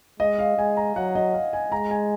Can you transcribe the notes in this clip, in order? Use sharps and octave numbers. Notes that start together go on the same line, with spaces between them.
G#3 D#5
F5
G#3 G#5
A#5
F#3 F#5
D#5
F5
G#5
G#3 A#5
G#5